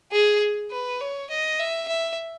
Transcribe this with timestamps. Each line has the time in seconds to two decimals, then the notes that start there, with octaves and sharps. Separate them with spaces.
0.12 G#4
0.71 B4
1.00 C#5
1.30 D#5
1.59 E5
1.88 E5